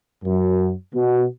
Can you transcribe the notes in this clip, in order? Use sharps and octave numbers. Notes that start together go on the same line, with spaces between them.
F#2
B2